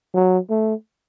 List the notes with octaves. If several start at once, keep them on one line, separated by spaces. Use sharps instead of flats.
F#3
A3